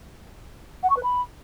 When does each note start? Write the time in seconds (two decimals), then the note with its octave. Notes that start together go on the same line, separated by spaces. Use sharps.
0.83 F#5
0.90 C#6
0.97 B4
1.03 B5